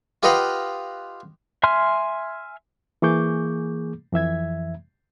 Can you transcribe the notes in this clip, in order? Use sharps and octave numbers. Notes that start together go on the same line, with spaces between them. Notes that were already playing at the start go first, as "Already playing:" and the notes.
F4 G4 B4 D#5 F5 F#5
E5 G#5 C6 F6
E3 A#3 G#4 C#6 D6 G6
F2 E3 E5 G#6